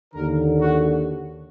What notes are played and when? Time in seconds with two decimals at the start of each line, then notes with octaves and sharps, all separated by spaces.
0.14 D#2 D3 A#4
0.61 F#4